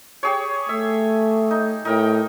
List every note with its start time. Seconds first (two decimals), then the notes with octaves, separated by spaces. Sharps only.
0.23 G4 G#4 C#5
0.69 A3 E5
1.51 D#4
1.85 A2 D#4 A#4 G5